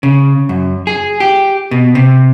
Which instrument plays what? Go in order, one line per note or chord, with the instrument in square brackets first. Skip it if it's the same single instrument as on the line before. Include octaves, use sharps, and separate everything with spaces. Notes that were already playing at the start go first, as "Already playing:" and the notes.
[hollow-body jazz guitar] C#3
F#2
G#4
G4
B2
C3